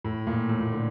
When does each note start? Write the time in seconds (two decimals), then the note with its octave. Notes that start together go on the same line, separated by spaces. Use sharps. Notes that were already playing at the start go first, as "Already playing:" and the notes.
0.04 A2
0.27 A#2
0.49 A2
0.61 A#2
0.72 D3